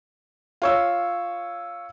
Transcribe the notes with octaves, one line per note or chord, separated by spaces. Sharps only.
F4 C#5 E6